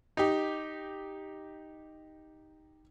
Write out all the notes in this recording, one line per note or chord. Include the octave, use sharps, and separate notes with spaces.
D#4 G4